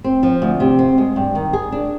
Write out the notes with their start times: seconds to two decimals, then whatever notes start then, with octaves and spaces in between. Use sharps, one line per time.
0.04 C4
0.23 F3
0.42 D2
0.60 C3
0.79 C4
0.98 G#3
1.16 G2
1.35 D#3
1.53 G#4
1.72 D4